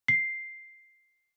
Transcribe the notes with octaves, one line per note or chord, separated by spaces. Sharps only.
C7